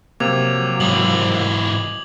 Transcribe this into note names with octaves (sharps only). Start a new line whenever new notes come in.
C3 F3 F#3 A#3 D6 G#6 F7
G#2 E3 D#6 F#7